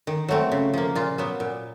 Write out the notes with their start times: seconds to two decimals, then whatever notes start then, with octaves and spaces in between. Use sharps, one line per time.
0.07 D#3
0.28 F#3 A3 C4
0.52 C#3
0.73 F3 A#3
0.95 A#2 F4
1.18 F#3 B3
1.40 A#2